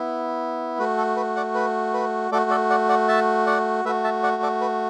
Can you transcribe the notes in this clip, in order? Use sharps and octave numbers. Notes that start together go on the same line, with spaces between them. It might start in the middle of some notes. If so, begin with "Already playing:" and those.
Already playing: B3 E4
A3 F#4 B4
A4
B4
D5 F#5
B4
B4
A3 F#4 A4 D5
A4 D5
D5 F#5
D5 F#5
E5 A5
D5 F#5
A3 F#4 B4 E5
E5 A5
D5 F#5
A4 D5
B4